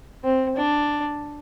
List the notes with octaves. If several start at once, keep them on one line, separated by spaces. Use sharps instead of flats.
C4
D4